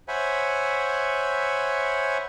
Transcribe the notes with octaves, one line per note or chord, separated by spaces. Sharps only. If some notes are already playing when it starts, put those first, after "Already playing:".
C5 C#5 E5 F#5 G#5 B5